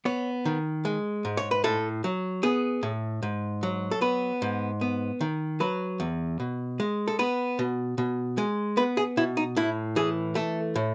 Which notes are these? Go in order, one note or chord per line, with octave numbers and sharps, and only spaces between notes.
B3 C#5
D#3
G#3
G#2
C#5
B4
A2 A4
F#3
B3 G#4
A2
G#2
F#3
A4
B3 B4
G#2
B3
D#3
F#3 B4
E2
B2
G#3
A4
B3 B4
B2
B2
G#3
B3 B4
G#4
B2 E4
D#4
A2 E4
E3 G#4
A3 A4
A2